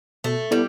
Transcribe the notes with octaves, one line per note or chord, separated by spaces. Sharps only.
B2 A3
G3 B3 E4 A4 D5